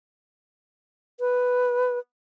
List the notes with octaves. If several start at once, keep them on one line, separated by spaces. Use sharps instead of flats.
B4